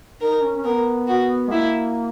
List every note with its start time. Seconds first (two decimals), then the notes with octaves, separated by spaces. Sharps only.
0.21 D#4 A#4
0.43 C#4
0.56 C#4
0.64 B3 A#4
1.08 F#4
1.48 G#3
1.51 A#3 E4